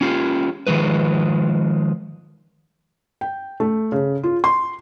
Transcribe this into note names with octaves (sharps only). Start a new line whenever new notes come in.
C#4 F4 G4
D#3 F3 G#3 B4
G5
A3
C#3
F4
C6